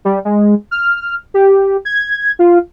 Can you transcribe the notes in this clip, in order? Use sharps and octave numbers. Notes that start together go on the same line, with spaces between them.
G3
G#3
F6
G4
G#6
F4